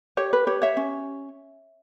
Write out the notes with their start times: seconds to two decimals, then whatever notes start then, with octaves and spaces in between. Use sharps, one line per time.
0.17 G4 C#5
0.33 B4
0.47 G4 C#5
0.62 C#5 E5
0.77 C#4